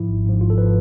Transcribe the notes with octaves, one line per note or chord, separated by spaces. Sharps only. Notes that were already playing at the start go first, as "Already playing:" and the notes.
Already playing: G#2 F3 E4
G#1
G#2 F3
G#1 F4
A4
B4
F3